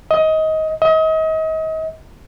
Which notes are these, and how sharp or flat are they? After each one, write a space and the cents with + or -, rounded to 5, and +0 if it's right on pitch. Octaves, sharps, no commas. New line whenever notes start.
D#5 +20
D#5 +35